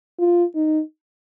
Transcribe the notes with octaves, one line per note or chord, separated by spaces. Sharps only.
F4
D#4